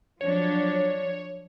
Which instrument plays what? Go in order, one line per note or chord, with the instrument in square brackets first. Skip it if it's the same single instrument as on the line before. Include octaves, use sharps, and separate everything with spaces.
[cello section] F3 F#3 D4 [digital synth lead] C#5